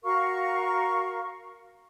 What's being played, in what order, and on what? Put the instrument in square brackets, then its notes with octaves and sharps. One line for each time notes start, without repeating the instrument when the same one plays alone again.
[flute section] F#4 A#4 F5 C#6